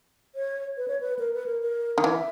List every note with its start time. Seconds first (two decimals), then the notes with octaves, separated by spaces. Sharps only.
0.35 C#5
0.77 B4
0.88 C#5
1.00 B4
1.19 A#4
1.33 B4
1.46 A#4
1.61 A#4
1.98 D#3
2.04 E3 E5